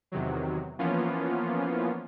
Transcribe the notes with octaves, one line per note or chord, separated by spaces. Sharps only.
E2 C3 D#3 F#3
E3 F3 A#3 B3 C#4 F4